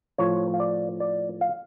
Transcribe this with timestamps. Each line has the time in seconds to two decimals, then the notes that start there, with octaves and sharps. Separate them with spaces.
0.18 A2 F3 C#5
0.54 F5
0.60 D5
1.00 D5
1.41 F5